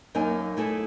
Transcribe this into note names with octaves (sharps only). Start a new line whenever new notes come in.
F#2 A#3 D#4 G#5
A3 E4 G#4 A4